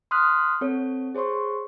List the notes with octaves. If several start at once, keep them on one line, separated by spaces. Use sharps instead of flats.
C6 D#6 F6 F#6 B6
C4 A4 C#5
G#4 C5 C#5 C6 C#6